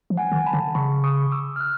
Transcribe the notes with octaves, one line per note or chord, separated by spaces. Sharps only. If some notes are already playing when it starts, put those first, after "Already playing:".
F3
F#5 G#5
D#3
A5 B5
D3
C#3 B5 C#6
C#6 D#6
D6 E6
F6
E6 F#6